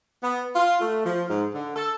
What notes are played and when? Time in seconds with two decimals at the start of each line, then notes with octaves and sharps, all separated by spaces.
0.24 B3
0.55 F4
0.81 A3
1.06 F3
1.29 G#2
1.54 D3
1.76 A4